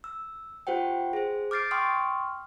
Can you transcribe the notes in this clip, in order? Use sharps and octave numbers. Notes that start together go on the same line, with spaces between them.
E6
F4 G4 C5 F#5 G5
G#4 C5
D6 F6 G6 A6 C7 D7
G5 C6 C#6 D#6 F6